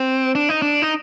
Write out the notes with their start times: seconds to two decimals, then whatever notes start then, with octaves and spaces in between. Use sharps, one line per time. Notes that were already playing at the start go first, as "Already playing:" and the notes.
Already playing: C4
0.35 D4
0.49 D#4
0.62 D4
0.82 D#4